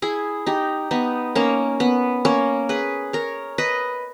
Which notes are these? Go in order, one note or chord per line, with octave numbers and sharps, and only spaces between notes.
E4 G#4
D#4 G4
B3 D#4
A#3 C#4
B3
A#3 C#4
G#4 B4
A#4 C#5
B4 D#5